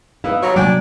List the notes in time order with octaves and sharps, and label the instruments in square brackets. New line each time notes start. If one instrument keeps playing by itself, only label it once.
[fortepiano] B3 D#4 E4 [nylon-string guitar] F5
[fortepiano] G#1 A#5 C#6 [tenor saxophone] F#3
[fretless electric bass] C3 G3 A#3 [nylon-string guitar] F#3 [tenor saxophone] D4 [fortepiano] D5 G5 G#5